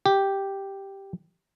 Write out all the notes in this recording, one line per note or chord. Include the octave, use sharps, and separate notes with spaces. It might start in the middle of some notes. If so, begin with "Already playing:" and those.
G4